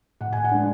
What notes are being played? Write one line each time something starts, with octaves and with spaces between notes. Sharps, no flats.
A2 F#5
G#5
F#5
G#3 D4